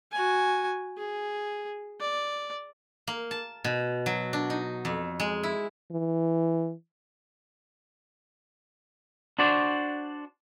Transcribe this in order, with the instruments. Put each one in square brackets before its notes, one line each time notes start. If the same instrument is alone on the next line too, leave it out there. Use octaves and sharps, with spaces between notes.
[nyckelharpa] F#4 G#5
G#4
D5
[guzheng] A#3
A5
B2
F#3
D4
D#4
F2
G#3
E4
[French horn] E3
[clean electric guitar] D4 F#4 C5 D5